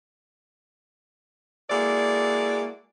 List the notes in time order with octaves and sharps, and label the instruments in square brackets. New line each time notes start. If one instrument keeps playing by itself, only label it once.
[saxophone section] G#3 A#3 E4 F#4 A4 D5